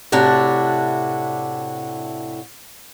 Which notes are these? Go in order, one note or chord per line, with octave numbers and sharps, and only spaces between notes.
A2 C3 D4 E4 F#4